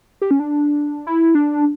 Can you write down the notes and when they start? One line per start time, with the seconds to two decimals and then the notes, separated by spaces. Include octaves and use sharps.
0.22 G4
0.31 C#4
0.40 D4
1.07 E4
1.35 D4